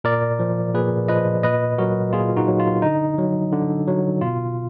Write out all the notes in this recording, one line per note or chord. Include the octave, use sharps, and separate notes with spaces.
A#2 A#4 D5
F3
A#2 G#4 B4
F3 B4 D#5
A#2 B4 D#5
F#3 F#4 A#4
A#2 F4 G#4
D#4 F#4
F#3
F4
D3 D#4
F#3
D3
F#3
B2 F4